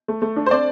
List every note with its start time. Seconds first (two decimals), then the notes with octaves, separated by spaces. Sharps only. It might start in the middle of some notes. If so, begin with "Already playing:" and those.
0.08 A3
0.22 A3
0.36 D4
0.46 C5
0.51 C4 D5